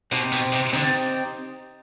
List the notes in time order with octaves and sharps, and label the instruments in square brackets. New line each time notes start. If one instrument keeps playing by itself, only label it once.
[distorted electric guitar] B2 [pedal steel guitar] C4 D#4 G4 C5
[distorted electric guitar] B2
C3
[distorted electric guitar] D3 [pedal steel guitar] C4 D#4 G4 C5